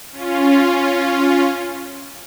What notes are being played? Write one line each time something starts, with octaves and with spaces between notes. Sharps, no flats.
C#4 F4